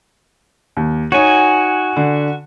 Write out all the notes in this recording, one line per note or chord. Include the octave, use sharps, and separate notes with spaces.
D#2
D#4 F#4 C#5 G#5
D3